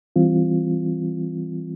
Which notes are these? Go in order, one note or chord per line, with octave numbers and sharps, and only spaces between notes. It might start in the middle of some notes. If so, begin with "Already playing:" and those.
E3 G3 C4 F4